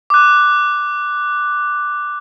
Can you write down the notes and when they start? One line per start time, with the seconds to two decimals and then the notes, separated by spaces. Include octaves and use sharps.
0.10 D6 F#6